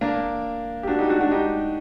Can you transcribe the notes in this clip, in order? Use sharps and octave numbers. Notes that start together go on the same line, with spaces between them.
A#3 D4
G4
D4 F#4
D#4 G4
D4 F#4
D4 F#4
D#4 G4